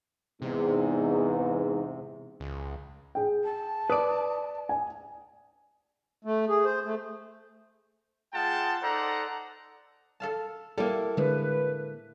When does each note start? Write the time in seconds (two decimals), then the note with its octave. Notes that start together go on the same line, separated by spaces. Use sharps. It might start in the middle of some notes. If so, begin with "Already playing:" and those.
0.42 E2 G#2 C3
2.40 C#2
3.15 G#4 G5
3.44 A5
3.90 B4 D5 D#6
4.69 G#5
6.24 A3
6.49 G#4
6.65 C5
6.85 A3
8.33 G#3 F4 G#4 F#5 G5 A5
8.83 D#4 A4 C5 D5 F#5 A#5
10.20 A4 F5 A5
10.78 G3 A#3 E4 A4
11.17 A2 D3 G#3 B4